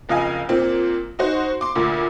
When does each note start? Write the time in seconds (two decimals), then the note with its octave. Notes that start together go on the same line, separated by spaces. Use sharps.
0.09 F#1 F2 D#5 F5 G#5
0.49 A#2 C4
1.19 D#4 F#4 C5
1.61 C6 D6
1.75 D2 A#2